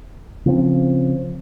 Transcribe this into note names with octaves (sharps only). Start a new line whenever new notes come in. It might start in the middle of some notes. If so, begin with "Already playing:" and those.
C#3 F3 C4